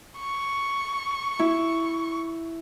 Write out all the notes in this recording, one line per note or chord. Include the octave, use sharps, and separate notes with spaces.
C#6
E4